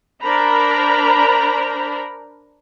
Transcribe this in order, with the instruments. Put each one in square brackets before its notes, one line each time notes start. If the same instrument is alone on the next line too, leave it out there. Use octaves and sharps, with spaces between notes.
[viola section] D4 A#4 C5 A#5 B5